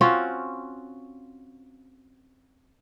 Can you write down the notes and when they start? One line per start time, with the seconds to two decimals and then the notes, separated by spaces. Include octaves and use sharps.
0.01 C4 C#4 F4 F#4